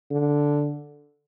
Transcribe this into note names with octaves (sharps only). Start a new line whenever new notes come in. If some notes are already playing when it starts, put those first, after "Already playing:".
D3